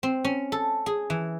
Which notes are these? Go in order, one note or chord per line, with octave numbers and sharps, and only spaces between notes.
C4
C#4
A4
G#4
E3